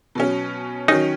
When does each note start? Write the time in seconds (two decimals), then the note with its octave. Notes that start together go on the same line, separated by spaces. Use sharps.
0.15 B2 F#3 C#4
0.88 D#3 F#3 C#4 D#4